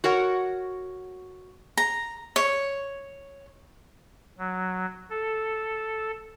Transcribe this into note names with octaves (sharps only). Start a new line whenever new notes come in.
F#4 A#4 C#5 F#5
A#5
C#5
F#3
A4